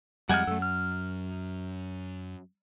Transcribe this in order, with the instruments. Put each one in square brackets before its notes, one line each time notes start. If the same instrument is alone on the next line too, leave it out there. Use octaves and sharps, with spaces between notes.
[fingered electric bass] F2 [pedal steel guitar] G3 G#3 F6 [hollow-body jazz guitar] F#5 G#5
[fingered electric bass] F#2 [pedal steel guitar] A3 A4
[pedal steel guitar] F6